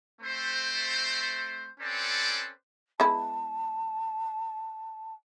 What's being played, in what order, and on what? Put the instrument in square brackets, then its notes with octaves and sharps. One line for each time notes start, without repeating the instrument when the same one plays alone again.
[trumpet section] A3 C4 C5
C4 C#4 A4 B4 C5 D5
[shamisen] G#3 B3 E4 [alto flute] A5